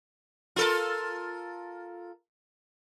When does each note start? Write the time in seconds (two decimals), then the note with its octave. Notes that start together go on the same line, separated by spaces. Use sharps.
0.56 F4 A4 A#4